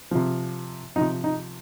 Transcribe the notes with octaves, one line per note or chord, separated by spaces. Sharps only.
C3 F3
C3 F3 D#4
D#4